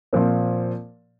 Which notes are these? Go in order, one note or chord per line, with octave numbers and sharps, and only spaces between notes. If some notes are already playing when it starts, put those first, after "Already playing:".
A#2 F3 C4